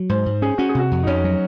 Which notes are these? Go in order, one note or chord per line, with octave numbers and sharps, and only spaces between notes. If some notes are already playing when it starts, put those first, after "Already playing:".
Already playing: F#3
G#2 C5
G#2
C#4 G#4
C#4 F#4
G#4
C3 F#4
F2
D#4
F2 C#4
F#3